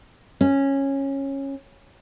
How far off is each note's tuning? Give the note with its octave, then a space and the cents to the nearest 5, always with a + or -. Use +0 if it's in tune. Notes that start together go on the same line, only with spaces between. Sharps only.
C#4 -15